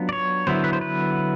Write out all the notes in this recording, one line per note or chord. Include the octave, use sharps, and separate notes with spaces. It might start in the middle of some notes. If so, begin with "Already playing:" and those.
Already playing: F#3 B3 D4 F4
D5
C#5
D3 F#3 B3 E4 C5
B4
C5
B4